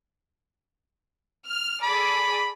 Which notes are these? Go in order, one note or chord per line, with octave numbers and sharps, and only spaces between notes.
F6
G#4 A4 D5 B5